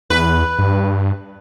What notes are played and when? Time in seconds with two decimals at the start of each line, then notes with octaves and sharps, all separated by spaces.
0.10 E2 B4
0.59 G2